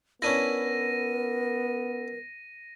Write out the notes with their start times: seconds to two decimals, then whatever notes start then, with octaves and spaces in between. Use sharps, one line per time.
0.22 B3 C#4 D4 E4 A#4 A#6 D#7